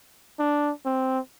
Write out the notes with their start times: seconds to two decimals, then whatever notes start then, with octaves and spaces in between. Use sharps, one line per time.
0.39 D4
0.86 C4